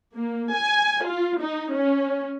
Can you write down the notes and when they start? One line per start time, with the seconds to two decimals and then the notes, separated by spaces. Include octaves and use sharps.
0.16 A#3
0.55 G#5
1.06 F4
1.42 D#4
1.74 C#4